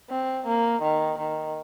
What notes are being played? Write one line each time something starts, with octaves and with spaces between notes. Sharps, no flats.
C4
A#3
D#3
D#3